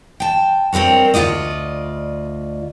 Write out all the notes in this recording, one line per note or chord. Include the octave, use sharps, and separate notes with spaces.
G5 A5
G2 C4 F#4 A#4 C#5
D2 B2 F4 D5 D#5